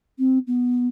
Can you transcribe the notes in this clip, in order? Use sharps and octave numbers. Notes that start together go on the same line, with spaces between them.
C4
B3